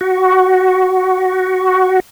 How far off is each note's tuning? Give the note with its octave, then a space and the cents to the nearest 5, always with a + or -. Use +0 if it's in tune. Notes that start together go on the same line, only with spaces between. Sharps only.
F#4 +10